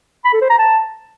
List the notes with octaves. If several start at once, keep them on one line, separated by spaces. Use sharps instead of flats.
B5
A4
C5
A#5
A5